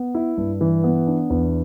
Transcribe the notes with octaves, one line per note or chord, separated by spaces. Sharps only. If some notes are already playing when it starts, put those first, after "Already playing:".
Already playing: B3
E4
G2
E3
B3
D4
E2